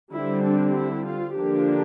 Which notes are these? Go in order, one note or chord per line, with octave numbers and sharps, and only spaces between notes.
D3 G3 C4 E4
D4
E4
F4
D3 F3 A#3 D4 G4